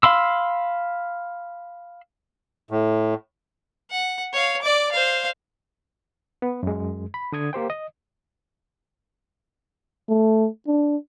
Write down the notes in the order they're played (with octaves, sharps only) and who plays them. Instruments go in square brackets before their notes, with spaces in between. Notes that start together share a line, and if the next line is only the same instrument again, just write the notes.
[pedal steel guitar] F5 B5 C6 E6
[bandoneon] A2
[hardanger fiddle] F#5
C#5 F5
D5 D6
C5 F5
[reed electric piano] B3
F#2 G#3
B5
D3 D#6 G#6
A#3 G4 C5 G5
D#5
[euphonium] A3
D4